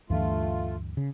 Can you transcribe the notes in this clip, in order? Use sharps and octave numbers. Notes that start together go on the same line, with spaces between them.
D2 G2 E3 A3 F4
C#3